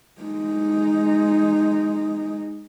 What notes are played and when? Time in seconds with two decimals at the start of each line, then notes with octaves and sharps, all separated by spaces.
0.22 G#3 D#4